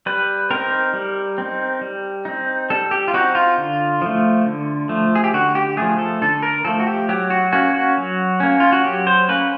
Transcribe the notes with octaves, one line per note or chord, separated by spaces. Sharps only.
G3 B4
C4 D#4 A#4
G3
C4 D#4
G3
C4 D#4
G3 A4
G4
F4
C4 D#4 F#4
F4
D3
F3 A3
D3
F3 A3
G#4
G4
D3 F#4
G4
F3 A3 G#4
A4
D3 A4
A#4
F3 A3 A4
F#4
G4
F#3 G4
F#4
A#3 C#4 F#4
F#4
F#3
A#3 C#4
F4
F#4
F#3 G4
C5
A#3 C#4 B4